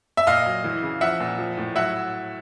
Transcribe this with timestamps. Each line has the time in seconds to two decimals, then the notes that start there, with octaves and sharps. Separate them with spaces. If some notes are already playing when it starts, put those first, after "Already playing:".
0.17 E5
0.27 A#2 D#5 F5
0.46 F#3
0.64 E3
0.82 C#3
1.01 F3 E5 F#5
1.20 A#2
1.38 F3
1.57 A2
1.75 F#3 E5 F#5